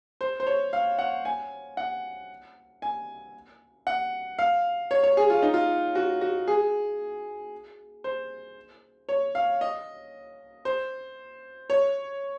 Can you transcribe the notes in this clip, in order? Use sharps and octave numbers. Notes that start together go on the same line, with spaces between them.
C5
C5
C#5
F5
F#5
G#5
F#5
G#5
F#5
F5
C#5
C#5
G#4
F4
D#4
F4
F#4
F#4
G#4
C5
C#5
F5
D#5
C5
C#5